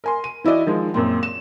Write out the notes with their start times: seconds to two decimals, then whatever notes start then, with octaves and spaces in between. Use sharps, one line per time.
0.04 A#4 G#5 C6
0.24 D#7
0.44 E3 E4 F#4 D5 D#5
0.66 D#3 F3 G#3
0.94 F#2 A#2 C4
1.23 E7